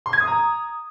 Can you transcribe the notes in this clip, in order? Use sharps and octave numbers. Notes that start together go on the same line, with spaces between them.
C6
G#6
D#6
A#5